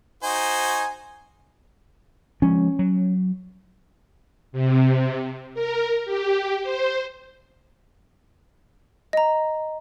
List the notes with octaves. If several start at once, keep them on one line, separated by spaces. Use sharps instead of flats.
D#4 F#4 C5 G#5
F3 G#3 C#4
F#3
C3
A#4
G4
C5
D#5 A#5